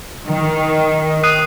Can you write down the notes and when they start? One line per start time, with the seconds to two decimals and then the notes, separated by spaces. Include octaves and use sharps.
0.27 D#3
1.24 D#6 F#6 C7 D#7